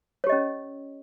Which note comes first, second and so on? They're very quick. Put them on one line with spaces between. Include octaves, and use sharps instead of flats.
C#5 G4 D#5 C#4